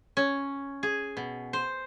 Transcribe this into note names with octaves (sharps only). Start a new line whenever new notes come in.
C#4
G#4
B2
C5